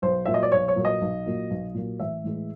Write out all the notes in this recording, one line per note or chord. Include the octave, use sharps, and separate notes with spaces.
B1 C5
A#2 F#3 A#3 E5
D#5
D5
B1 C#5
C#5
A#2 F#3 A#3
D#5
B1
A#2 F#3 A#3
B1
A#2 F#3 A#3
A1 E5
A2 E3 G#3